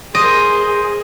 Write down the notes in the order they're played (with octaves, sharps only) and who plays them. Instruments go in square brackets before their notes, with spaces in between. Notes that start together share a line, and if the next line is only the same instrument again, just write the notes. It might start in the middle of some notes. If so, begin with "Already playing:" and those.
[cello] G#4 [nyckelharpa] A#4 C5 [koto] D#5